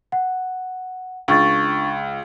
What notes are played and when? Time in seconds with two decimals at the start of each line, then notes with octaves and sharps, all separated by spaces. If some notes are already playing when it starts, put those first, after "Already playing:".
0.12 F#5
1.28 C#2 D4 C#6 A6